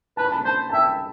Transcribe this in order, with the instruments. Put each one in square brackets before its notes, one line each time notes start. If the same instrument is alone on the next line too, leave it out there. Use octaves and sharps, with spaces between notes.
[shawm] B4 [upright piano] A5
[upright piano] B5
A5
[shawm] C5 [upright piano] A5
[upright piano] A5
[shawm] E5 [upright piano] G5